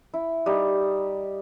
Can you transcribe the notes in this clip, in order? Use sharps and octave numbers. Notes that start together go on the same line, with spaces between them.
E4
G3 D#4